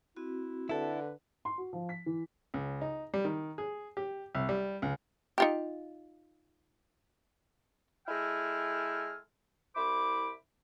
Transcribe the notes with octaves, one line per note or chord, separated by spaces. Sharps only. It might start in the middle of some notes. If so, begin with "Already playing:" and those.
C4 E4 F#4
D3 E4 A4 B4
C6
F#4
F3
B6
E3
C#2
D#4
G3
D#3
G#4
G4
C2
G3
C#2
D#4 F4 G4
G#3 E4 A4 G5 G#5 F6
C2 E4 C5 B5 D6